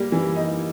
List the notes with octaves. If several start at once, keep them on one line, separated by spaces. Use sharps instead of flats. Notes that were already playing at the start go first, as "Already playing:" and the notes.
Already playing: G3 A#3
E3
D#4